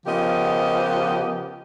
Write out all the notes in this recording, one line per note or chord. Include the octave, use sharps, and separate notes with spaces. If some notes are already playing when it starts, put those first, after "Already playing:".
C#3 F3 B3 G4 A#4 D#5